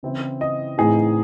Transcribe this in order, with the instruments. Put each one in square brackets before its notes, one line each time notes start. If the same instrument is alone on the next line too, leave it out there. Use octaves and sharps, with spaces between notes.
[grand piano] C#3 E3 C4 E4
[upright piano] D#5
[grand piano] A2 E3 C4 D#4 [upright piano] G#4